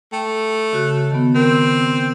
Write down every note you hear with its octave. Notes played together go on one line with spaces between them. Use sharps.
A3 G5
C#3 F#4 F#6
D#3 B3
C4 A#4